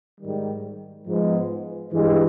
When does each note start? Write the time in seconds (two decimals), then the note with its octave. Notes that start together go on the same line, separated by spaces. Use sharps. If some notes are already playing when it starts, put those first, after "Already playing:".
0.20 G#2 D#3 G3
1.06 G#2 F3 G#3 B3
1.92 G2 E3 G#3